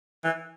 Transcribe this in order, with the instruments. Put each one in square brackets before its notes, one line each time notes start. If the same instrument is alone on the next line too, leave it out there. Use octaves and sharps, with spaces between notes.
[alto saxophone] E3